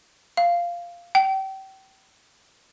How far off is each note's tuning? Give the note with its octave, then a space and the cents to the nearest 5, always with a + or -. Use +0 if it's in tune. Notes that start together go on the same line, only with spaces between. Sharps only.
F5 -10
G5 -35